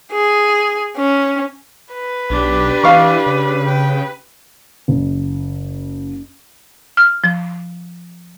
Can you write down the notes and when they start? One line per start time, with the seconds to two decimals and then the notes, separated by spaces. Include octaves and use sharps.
0.12 G#4
0.97 C#4
1.94 B4
2.30 B1 D4 G4
2.84 E3 F5 C#6
3.26 C#3
3.66 G5
4.88 F#1
6.97 F6
7.24 F3